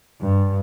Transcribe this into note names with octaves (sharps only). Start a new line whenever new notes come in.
G2